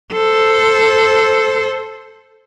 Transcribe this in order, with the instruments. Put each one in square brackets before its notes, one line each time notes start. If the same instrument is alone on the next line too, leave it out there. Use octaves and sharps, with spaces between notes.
[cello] A4 C5